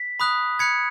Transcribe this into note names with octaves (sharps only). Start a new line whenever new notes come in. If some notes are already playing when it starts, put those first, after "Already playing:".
Already playing: B6
B5 D#6 F#6
B5 F#6 G#6 C#7